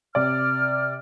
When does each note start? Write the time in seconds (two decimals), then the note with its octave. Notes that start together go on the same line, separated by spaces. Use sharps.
0.15 C3 D5 F6